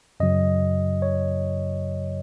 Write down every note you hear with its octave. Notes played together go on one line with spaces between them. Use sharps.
F#2 C#3 F#3 D#5
C#5